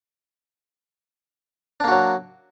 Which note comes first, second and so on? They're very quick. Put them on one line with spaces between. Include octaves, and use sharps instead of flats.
D4 A#3 F#4 F#3